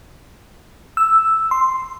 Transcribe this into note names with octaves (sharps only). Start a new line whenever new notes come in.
E6
C6